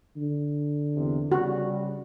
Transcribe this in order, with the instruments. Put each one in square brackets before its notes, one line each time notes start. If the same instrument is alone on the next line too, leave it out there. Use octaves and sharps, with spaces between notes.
[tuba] D3
[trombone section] E2 C3
[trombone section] C#3 G3 [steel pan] F#4